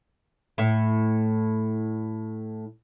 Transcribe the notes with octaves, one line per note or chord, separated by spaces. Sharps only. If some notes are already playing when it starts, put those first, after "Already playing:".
A2 E4